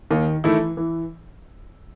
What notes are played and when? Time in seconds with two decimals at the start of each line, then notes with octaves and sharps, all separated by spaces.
0.11 D#2 D#3
0.44 D#3 E3 A3 E4
0.77 E3